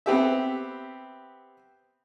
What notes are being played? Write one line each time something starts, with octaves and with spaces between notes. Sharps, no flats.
B3 C4 G4 E5